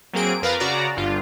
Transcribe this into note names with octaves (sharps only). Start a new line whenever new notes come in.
F#3 A#3 C4 G#4 D7
F2 A#4 B4 F5 A#5 A6
C#3 F#4 D5 A#5
G1 G2 F4